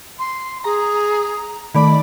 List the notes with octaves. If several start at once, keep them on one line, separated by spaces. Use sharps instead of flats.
C6
G#4 A#5
D#3 A3 D5 B5